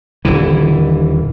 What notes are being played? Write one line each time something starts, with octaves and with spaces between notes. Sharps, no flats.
D#1 D3 E3